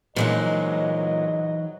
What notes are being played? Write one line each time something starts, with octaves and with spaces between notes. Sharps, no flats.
A#2 E3 F#3 G#3 D#4 C5 D#5 F#5